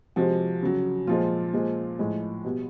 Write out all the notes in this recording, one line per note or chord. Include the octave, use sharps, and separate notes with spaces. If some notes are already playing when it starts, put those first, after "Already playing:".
C3 F3 G#3 F#4
C#3 F#3
A#2 F3 G#3 F4
A#2 F3 G#3
A2 F3 G#3
B2 G3